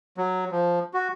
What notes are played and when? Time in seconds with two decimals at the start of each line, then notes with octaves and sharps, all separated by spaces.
0.17 F#3
0.52 F3
0.94 F#4